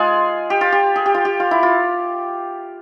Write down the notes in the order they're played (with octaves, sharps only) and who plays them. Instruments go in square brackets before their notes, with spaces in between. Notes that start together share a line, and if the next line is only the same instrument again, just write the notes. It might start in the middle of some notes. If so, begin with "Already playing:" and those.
Already playing: [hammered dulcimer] G#3 F4 G#4
G4
F4
G4
G#4
G4
F4
G4
F4
E4
F4